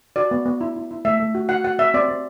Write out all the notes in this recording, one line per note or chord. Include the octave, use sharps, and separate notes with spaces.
F#4 D5
B3
B3
E4
E4
E4
A3 E5
A3
F#4
F#4 F#5
F#4 F#5
C4 E5
C4 D5
C4